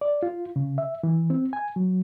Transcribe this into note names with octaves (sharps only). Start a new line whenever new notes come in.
D5
F4
C#3
E5
E3
C4
G#5
F#3